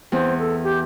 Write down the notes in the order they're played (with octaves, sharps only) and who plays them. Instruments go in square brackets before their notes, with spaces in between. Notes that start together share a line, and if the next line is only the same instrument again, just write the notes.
[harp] E2 [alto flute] C4
[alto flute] A4
G4